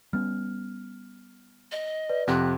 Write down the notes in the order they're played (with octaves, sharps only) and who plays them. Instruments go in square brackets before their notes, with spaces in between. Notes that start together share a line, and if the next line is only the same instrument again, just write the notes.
[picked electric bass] G3 B3 C#4 [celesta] F6
[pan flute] D#5
[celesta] B4 D5
[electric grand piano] F2 C3 [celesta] F#5 C6 [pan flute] F#6